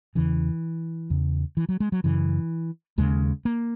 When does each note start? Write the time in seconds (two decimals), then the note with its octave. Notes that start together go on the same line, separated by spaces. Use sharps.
0.15 E2 C#3 E3
1.10 E2 C#3
1.57 E3
1.69 F#3
1.80 G#3
1.92 F#3
2.04 F#2 C#3 E3
2.98 D#2 C#3 G#3
3.45 A#3